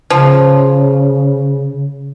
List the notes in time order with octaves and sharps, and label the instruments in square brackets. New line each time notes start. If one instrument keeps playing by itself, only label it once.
[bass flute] C#3 [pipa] F3